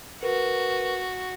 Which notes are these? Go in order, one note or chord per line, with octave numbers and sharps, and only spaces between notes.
F#4 A#4 B4